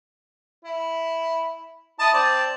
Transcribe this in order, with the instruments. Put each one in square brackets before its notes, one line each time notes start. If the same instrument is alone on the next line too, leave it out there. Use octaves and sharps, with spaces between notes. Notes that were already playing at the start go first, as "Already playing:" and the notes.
[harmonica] E4
E4 D#5 A5
C4 D5 A5